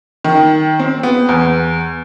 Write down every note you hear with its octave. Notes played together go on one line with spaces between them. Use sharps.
D#3
C4
B3
E2